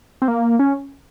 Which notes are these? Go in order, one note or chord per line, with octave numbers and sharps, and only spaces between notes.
C4
A#3
C#4